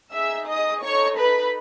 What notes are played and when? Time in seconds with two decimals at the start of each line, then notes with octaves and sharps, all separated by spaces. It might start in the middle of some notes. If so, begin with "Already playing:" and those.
0.12 D#4 G#4 E5 E6
0.48 D#5 D#6
0.82 D#4 A4 C#5 C#6
1.18 B4 B5